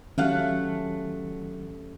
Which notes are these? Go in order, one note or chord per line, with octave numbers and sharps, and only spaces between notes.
D#3 F#3 A3 C#4 G4 A4 F5 F#5